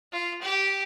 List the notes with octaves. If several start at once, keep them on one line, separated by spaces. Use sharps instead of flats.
F4
G4